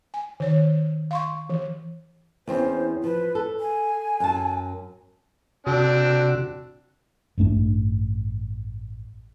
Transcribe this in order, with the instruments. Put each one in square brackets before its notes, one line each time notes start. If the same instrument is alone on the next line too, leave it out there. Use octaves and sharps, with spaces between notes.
[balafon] G#5
D#3 C#5
F5 C6 C#6
E3
[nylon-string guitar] E2 C4 C#4 [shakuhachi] C5
[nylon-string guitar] F3 [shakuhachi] B4
[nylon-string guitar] A4
[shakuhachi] G#5
[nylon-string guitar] F#2 A5
[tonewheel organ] C3 F#4 [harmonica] C4 D4 E6
[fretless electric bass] A1 G2 A3 D4